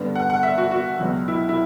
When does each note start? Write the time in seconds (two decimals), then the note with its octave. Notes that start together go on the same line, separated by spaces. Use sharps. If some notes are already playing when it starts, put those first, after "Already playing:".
Already playing: G2 D3 G3 B3
0.15 F#5
0.30 F#5
0.43 E5
0.58 F#4
0.71 F#4
0.99 C#2 B2 F#3
1.28 E4
1.49 E4